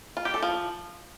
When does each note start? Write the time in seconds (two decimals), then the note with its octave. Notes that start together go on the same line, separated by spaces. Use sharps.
0.17 F4
0.25 G4
0.34 A4
0.43 F3